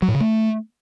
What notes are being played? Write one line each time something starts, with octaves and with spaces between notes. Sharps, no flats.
F#3
A2
C#3
A3